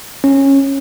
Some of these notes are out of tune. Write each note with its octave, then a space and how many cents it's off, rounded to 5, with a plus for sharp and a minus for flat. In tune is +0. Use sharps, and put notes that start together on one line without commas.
C#4 -15